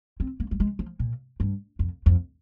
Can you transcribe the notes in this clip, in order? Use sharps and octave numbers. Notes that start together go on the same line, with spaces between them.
C4
A#3
G3
G#3
F3
A#2
G2
F2
F2